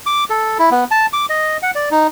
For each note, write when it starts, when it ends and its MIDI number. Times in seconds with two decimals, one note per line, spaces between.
0.06 0.24 86
0.30 0.58 69
0.59 0.70 64
0.71 0.84 59
0.91 1.06 81
1.13 1.26 86
1.29 1.57 75
1.63 1.71 78
1.75 1.89 74
1.91 2.07 63